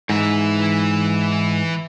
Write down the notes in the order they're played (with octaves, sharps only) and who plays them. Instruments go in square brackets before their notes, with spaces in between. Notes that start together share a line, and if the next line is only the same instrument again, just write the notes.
[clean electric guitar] G#2 [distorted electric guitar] E3 E5